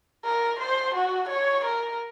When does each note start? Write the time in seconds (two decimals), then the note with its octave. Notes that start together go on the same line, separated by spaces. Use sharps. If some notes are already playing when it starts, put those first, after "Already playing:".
0.25 A#4
0.60 C5
0.95 F#4
1.29 C#5
1.65 A#4